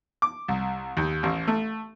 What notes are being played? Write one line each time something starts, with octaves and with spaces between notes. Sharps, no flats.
D6
C2
D#2
A1
A3